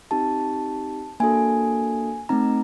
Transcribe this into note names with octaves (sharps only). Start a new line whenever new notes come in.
C4 D#4 G4 A5
A#3 D4 F#4 A4 G#5
A3 C4 D#4 A#5